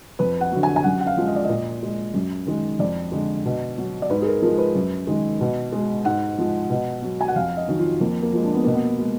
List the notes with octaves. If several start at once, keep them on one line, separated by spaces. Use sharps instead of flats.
F2 B4
F#5
D3 F#3
G#5
G#5
F#2 F#5
F#5
F5
F3 G#3
D#5
D5
A#2 D#5
G#3
F#2
D#3 G#3
F2 D5
D3 G#3
B2
F#3
D5
G#2 B4
G#4
A#4
F3 G#3 A#4
B4
F#2
D#3 G#3
B2
G#3
G#2 F#5
F3 G#3
B2
F#3
G#5
F#5
F2 F5
D#5
D#3 F#3
F4
F2 A#3
A#3
F3 G#3
D4
B3
B2 A#3
B3
G#3